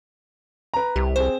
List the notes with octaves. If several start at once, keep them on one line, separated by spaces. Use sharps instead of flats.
B4 A#5
C2 G4
C4 G#4 C5